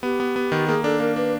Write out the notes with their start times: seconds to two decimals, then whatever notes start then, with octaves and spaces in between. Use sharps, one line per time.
0.03 B3 G4
0.20 B3
0.36 B3
0.52 D#3
0.68 A#3 G#4
0.84 D4 A4
1.00 A#3 A#4
1.16 D4 B4